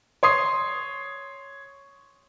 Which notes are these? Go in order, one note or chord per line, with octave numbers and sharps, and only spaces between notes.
C#5 C6 D#6 C7